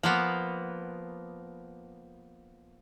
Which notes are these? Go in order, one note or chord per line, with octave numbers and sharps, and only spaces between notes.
F3 A#3 B3